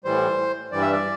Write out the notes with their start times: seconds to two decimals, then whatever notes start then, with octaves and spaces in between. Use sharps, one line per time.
0.04 A2 E3 G3 C5
0.71 G2 E3 G3 D5
0.81 E5
0.92 D5